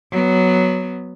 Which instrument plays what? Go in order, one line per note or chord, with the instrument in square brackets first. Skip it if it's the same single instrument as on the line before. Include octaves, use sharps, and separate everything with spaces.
[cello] F#3 B3